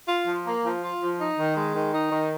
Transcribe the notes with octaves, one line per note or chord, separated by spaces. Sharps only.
F4
F3
A#3
F3
F4
F3
D#4
D#3
G#3
D#3
D#4
D#3